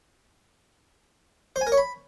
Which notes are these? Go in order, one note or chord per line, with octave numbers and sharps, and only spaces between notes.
C5
G#5
A#4
C#5
B5